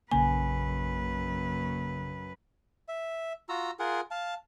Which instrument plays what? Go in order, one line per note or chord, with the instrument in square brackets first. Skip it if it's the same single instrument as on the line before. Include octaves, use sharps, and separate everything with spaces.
[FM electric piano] A#1 C#3 A#3 [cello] F#2 B4 [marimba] G#5
[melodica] E5
F4 F#4 A#5 E6
F4 G#4 A#4 F#5
F5 A5